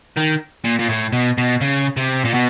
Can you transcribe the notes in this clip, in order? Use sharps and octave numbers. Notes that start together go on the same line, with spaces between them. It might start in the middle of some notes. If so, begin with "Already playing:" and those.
D#3
A#2
A#2
A2
B2
B2
C#3
C3
A#2
B2